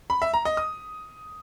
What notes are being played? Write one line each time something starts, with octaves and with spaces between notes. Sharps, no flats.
B5
E5
A#5
D#5
D#6